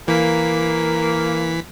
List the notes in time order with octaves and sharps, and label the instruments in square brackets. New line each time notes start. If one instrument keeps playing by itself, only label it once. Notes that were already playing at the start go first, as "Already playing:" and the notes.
[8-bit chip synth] E3 B6 [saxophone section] A#3